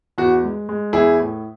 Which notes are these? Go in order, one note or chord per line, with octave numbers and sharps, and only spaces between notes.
E2 F#4
G#3
G#3
E2 E4 G#4
A2